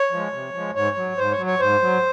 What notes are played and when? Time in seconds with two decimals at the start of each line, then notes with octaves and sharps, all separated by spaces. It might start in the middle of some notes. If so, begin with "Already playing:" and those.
Already playing: C#5
0.11 F3 G#3
0.33 C3
0.54 F3 G#3
0.75 G#2 C#5
0.96 F#3
1.17 G#2 C5
1.32 C#5
1.38 F#3
1.46 C#5
1.60 G#2 C5
1.81 F#3